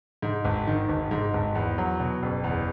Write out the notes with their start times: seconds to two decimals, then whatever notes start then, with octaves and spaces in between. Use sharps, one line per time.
0.22 G#2
0.45 G#1
0.67 D#3
0.89 G#1
1.11 G#2
1.34 G#1
1.55 E2
1.78 F#3
1.99 B2
2.22 F#1
2.44 E2